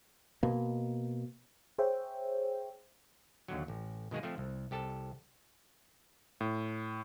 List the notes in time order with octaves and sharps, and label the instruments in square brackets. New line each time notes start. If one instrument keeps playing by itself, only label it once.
[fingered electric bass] B2 A#3
[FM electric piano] G#4 C5 C#5 E5 G5
[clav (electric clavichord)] D#2 D3 F#3
A1
B2 D#3 G#3 A#3 G#4
F3 A3 C4
C2
C2 G4 A4 A5
[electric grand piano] A2